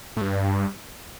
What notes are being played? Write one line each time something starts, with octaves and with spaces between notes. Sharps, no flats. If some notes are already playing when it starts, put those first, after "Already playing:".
A2
G2